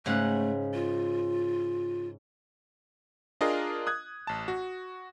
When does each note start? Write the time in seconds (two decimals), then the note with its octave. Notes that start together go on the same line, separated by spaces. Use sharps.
0.06 G#2 C#3 A3 F#5
0.74 F4
3.41 D4 F4 G#4 A#4 D#5 F5
3.87 D#6 F#6 G#6
4.27 A1 A5
4.48 F#4